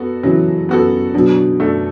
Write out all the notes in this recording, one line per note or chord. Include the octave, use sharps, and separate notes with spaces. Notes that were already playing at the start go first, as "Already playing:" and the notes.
Already playing: B3 F#4 A4
C#3 E3 F#3
B3 F#4 A4
B2 D3 F#3
A3 D4 F#4 A4